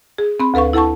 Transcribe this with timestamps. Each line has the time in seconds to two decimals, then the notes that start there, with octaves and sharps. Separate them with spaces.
0.18 G#4
0.40 C4 B5
0.54 D2 A4 B4 F5 C#6
0.73 E4 A4 F#5 A5 C#6